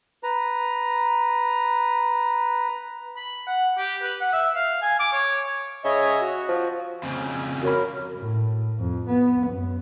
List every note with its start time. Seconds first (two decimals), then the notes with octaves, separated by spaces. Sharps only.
0.23 B4 A#5
3.16 B5
3.47 F#5
3.78 G4
4.02 B4
4.21 F#5
4.33 E5
4.55 F5
4.82 G#5
5.00 D6
5.13 C#5
5.84 C#3 C#5 D#5 E5
6.21 F#4
6.49 F3
7.03 F2 C#3
7.63 F#4 A#4 C#5 B5
8.16 A2
8.78 F2
9.08 B3
9.45 F#2